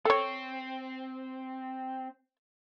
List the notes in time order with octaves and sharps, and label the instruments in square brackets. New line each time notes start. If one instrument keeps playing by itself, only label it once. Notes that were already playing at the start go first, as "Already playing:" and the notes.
[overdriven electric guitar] C4 [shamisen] A4 C#5